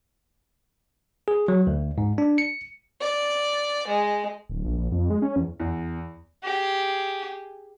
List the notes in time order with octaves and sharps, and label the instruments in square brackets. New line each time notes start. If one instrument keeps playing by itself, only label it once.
[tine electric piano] G#4
F#3
D2
G#2
D4
C#7
[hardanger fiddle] D5
G#3
[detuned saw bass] D1
A#1
A#1
F2
G#3
C#4
E2
[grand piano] E2
[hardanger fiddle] G4 G#4